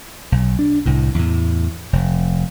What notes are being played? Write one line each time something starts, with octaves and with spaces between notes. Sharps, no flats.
B1
D4
C2 A2
E2 A2
F1